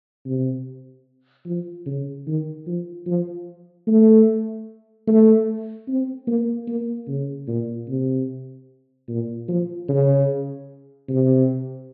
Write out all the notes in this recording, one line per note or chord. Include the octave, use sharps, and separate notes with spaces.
C3
F3
C#3
D#3
F3
F3
A3
A3
C4
A#3
A#3
C#3
A#2
C3
A#2
F3
C#3
C3